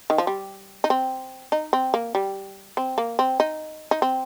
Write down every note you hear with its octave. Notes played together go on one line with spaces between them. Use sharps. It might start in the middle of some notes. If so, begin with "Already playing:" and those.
D#3
F3
G3
D#4
C4
D#4
C4
A#3
G3
C4
A#3
C4
D#4
D#4
C4